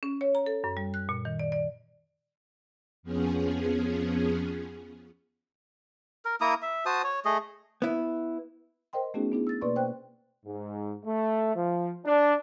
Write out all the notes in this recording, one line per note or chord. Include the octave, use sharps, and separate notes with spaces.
C#4
C#5
A#5
A4
F#2
G3
F#6
A#2
D#3
D5
D5
F2 F3 B3 C#4 G#4
A#4
A#3 E4 A#5 D#6
E5
F#4 C5 A5 D#6
C#5
A3 G#4 D#5
B3 E4
A#4 C5 D#5 G5 C6
A3 B3 C#4 D#4 F#4 G#4
B3 D4 E4 G#4
E6 A6
B2 A#3 B4 D5 C6 C#6
C5 G5 F#6
G#2
A3
F3
D4